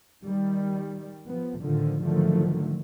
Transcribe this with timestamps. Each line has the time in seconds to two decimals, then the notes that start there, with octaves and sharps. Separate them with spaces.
0.24 D#3 G3
1.27 F3 B3
1.61 A2 D3 D#3 F3
2.02 G#2 D3 D#3 F3 F#3 A3